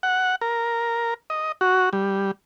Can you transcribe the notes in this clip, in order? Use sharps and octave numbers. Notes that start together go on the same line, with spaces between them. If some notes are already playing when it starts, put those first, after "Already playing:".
F#5
A#4
D#5
F#4
G3